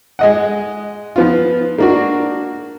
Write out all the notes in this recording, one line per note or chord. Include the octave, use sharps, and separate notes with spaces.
G#3 D#5 F#5
F3 B3 F4
A#3 D4 F#4